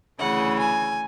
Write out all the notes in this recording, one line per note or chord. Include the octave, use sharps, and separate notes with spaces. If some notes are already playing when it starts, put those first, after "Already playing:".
D2 C#3 E3 F#5
G#5